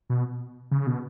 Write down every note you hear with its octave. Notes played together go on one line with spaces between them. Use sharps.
B2
C#3
B2